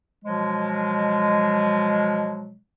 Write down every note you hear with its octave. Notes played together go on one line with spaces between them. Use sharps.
B2 F3 F#3 G#3